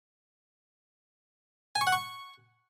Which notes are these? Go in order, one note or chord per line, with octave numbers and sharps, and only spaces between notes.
G#5
C#6
F#5
C#6